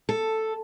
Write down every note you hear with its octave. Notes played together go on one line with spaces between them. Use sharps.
A4